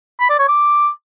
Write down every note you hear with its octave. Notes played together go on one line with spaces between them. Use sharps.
B5
D5
C#5
D6